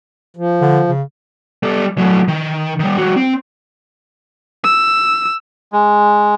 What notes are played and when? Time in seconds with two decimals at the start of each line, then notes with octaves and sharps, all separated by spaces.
0.37 F3
0.61 D3
0.89 C#3
1.63 G3 A4
1.98 F#3 A3
2.28 D#3
2.80 D#3 G3
2.98 G3 F#4
3.16 C4
4.64 E6
5.73 G#3